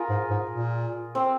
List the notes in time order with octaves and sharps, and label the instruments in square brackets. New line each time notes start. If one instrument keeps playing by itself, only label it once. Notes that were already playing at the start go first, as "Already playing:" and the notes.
Already playing: [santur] F4 G#4 A#4
[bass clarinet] G#2
G#2
A#2
[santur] C4